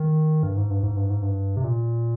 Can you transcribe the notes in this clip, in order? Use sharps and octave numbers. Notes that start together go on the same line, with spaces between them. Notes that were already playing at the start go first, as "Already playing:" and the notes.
Already playing: D#3
G2
G#2
G2
G#2
G2
G#2
G2
C3
A#2